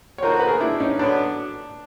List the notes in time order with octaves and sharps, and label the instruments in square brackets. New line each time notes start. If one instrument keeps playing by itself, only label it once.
[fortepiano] C#5
[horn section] D3 F3 A#3 D#4 F#4 [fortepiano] A#4 C5
[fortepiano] B4
G#4 A#4
D4 E4
C#4 D#4
[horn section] D3 F#3 B3 [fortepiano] D4